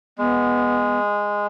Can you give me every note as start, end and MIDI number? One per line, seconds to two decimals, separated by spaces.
0.18 1.47 56
0.18 0.99 59